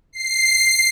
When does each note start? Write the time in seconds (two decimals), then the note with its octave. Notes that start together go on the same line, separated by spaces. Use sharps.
0.13 C7